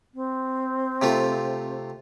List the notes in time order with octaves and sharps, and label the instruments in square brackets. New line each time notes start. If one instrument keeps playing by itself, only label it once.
[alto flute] C4
[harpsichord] C3 A3 F4